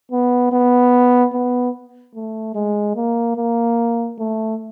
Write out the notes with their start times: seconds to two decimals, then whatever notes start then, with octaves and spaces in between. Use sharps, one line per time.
0.12 B3
0.52 B3
1.33 B3
2.15 A3
2.55 G#3
2.96 A#3
3.37 A#3
4.18 A3